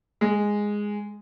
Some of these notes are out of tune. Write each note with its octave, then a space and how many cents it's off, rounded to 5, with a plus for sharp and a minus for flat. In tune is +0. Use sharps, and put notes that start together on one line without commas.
G#3 -5